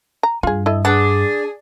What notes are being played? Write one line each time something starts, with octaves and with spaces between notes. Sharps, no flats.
A#5
G2 F4 G#4
E4 A4 D#5
D4 G#4 B4 F#5